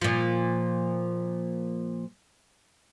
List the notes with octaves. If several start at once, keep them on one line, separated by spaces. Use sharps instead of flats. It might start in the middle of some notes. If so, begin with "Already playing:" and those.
A#2 F3